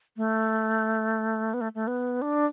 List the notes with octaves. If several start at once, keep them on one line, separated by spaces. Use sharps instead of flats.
A3
B3
A3
A3
B3
D4